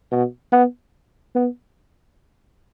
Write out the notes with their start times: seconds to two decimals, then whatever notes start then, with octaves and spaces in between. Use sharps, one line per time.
0.11 B2
0.52 B3
1.35 B3